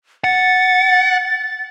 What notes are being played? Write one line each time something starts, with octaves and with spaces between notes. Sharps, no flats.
F#5 A6